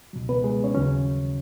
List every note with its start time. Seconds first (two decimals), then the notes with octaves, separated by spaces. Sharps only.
0.13 C#2 B2 F#3
0.29 B3 B4
0.44 G#3 G#4
0.64 C#4 C#5
0.74 D#2 C#3 F#3 C#4 C#5